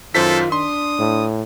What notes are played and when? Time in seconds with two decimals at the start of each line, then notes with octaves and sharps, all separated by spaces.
0.15 F#2 D#3 F4 A4 C5 B6
0.52 D4 C6 D#6
0.99 A2